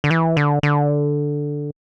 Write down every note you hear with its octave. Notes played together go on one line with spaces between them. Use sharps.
D3
E3
D3
D3